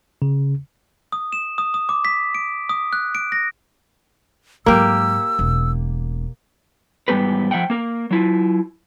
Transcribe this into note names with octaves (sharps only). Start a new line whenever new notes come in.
C#3
D#6
E7
D#6
D#6
D6
B6
D7
D#6
F#6
D7
A#6
G#2 F#3 A#3 G4 E6
E1
E2 G#2 G3 B3 G4 B4
F3 E5 F#5 G5
A#3 A#4
F#3 E4 F4